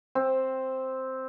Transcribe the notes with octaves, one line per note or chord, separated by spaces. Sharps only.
C4